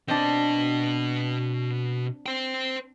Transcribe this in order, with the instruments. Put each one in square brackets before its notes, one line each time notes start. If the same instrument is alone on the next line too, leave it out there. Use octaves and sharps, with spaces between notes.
[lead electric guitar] B2 D#5 [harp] C4 D4
[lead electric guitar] C5 G5